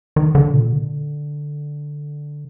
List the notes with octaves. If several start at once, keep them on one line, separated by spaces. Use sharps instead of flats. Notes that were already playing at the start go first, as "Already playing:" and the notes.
D#3
D3
A#2
D3